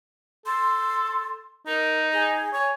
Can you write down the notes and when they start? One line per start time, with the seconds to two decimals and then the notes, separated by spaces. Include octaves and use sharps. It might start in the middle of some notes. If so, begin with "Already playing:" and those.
0.46 A4 C6
1.67 D#4 A#4
2.13 G#4
2.53 C#5 G#5